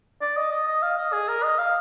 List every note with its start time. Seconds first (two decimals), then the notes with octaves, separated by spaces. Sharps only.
0.21 D5
0.36 D#5
0.52 D#5
0.67 D#5
0.82 F5
0.98 D#5
1.13 G#4
1.28 A#4
1.43 D#5
1.58 F5